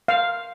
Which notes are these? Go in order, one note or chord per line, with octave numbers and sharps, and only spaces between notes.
F5